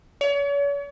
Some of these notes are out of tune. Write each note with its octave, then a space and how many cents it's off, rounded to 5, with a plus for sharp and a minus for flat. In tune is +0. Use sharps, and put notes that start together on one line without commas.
C#5 +40